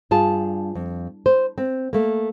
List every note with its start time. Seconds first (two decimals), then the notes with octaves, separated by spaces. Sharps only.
0.11 G2 F4 G#4 A5
0.75 F2
1.26 C5
1.58 C4
1.93 A3 A#3